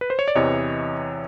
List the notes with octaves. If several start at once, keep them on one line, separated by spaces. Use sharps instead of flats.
B4
C5
C#5
D5
E2 C3 E3 C#5 D#5